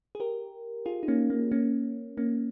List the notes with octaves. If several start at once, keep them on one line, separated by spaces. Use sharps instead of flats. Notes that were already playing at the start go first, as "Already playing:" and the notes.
G#4
G4 A#4
F4 G#4
D#4
A#3 C#4
A#3
A#3 C#4
A#3 C#4